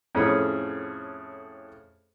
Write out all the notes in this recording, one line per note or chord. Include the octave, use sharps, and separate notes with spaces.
F2 A2 C#4 G#4 C#5 B5